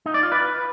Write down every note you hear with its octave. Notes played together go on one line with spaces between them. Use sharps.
D#4
D5
F4
B4